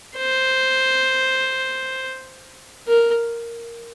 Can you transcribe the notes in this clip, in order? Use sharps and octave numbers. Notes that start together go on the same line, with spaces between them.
C5
A#4